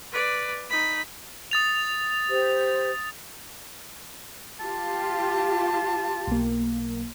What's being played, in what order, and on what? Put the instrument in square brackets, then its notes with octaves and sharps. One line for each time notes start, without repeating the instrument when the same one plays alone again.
[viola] B4 D5
D#4 B5
[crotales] D#6 A6 F7
[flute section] G4 C5
[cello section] F4 G4 [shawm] A5
[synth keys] B1 A#3